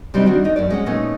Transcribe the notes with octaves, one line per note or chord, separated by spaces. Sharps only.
C3 G3 C4 D4 D#4
D#3 D4 F#4
D#2 D#4
F#2 A3 D5
G#3 C#4 F#5
A#2 A3 B3 C#4 D#4